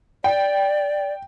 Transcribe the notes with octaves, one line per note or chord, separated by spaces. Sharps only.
D5 G5